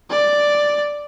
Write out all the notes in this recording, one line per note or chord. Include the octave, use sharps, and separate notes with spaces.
D5